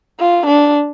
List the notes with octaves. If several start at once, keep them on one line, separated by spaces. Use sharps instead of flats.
F4
D4